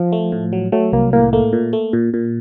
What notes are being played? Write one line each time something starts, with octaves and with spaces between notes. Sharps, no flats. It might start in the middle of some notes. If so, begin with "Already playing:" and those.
Already playing: F3
A3
A2
F#3
F#3 A3
C2 A#3
A2 A#3
A3 A#3
A#2
A3
A#2
A#2